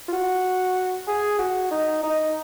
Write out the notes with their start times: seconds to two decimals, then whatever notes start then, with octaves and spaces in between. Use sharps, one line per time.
0.08 F4
0.13 F#4
1.08 G#4
1.39 F#4
1.71 D#4
2.03 D#4